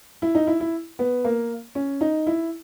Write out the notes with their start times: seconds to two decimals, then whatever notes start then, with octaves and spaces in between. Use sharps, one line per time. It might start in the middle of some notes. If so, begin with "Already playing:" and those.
0.22 E4
0.35 D#4
0.47 E4
0.60 E4
0.99 B3
1.24 A#3
1.75 C#4
2.01 D#4
2.27 E4